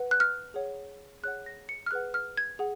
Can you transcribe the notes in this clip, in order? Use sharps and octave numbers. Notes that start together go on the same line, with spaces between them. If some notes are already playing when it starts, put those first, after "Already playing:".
Already playing: B4 F#5
F#6
F6
G#4 C#5 F#5
G#4 C#5 F#5 F#6
A#6
C#7
F6
G#4 B4 F#5 F#6
F6
G#6
G#4 F#5